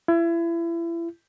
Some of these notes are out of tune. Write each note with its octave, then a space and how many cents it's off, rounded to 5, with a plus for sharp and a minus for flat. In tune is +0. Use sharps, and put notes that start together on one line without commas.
E4 +30